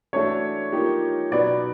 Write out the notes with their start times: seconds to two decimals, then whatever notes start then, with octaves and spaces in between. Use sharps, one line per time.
0.13 E3 A3 D4 F#4 A4 C#5
0.72 F3 A#3 D#4 G4
1.32 B2 F#3 B3 D#4 D5